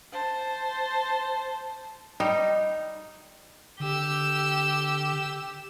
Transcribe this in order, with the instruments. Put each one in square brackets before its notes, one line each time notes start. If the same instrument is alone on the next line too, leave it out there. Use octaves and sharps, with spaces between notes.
[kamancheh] C5 A5
[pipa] G3 [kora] D#4
[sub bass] D3 [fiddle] G4 E6